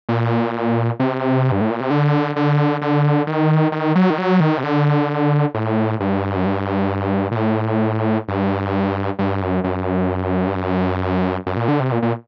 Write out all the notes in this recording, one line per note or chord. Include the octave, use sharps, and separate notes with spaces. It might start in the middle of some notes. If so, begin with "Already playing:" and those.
A#2
C3
G2
A2
A#2
C3
D3
D3
D3
D#3
D#3
F#3
D#3
F#3
D#3
C3
D3
A2
G2
F#2
G2
A#2
A2
G2
G2
F#2
F#2
G2
F#2
F#2
A#2
D3
C3
A#2
A#2